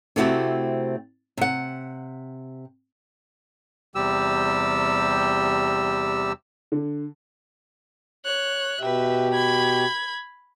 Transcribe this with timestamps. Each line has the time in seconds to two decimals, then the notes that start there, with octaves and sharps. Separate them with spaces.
0.16 C3 A3 C4 E4 F#4 G4
1.37 C3 F#5
3.95 E2 C3 G3 G4 E6
6.72 D3
8.25 C#5 F#6
8.81 B2 G4 B4 E5
9.34 B5 G#6